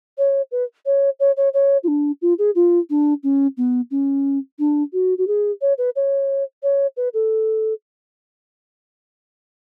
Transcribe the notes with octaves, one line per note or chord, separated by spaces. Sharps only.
C#5
B4
C#5
C#5
C#5
C#5
F4
D4
F4
G#4
F4
D4
C#4
B3
C#4
D4
F#4
F#4
G#4
C#5
B4
C#5
C#5
B4
A4